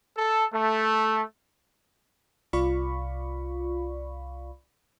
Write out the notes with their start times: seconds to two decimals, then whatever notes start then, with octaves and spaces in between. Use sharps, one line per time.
0.17 A4
0.54 A3
2.53 C2 F4 D5 F5 B5 C#6